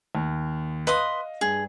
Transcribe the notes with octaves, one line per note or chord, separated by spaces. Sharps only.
D#2
B4 D#5 F5 C6 D#6
G2 G#4